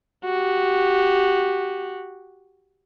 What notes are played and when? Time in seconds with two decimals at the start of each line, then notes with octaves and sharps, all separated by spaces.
0.25 F#4 G4